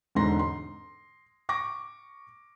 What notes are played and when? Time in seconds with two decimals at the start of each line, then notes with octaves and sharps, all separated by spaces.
0.15 E1 G#2 D3 D#4 C6 A#6
0.39 C6
1.49 C#6 D6 A#6